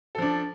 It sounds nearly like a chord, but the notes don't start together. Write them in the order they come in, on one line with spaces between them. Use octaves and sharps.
A4 F3 D4